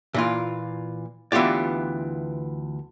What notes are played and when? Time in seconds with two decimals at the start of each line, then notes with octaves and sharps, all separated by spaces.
0.14 A#2 E3 F4
1.32 D2 E3 B3 F4 G4 D5